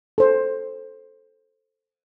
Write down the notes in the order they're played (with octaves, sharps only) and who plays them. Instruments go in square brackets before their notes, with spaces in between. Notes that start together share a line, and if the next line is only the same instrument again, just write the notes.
[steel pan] A4 C5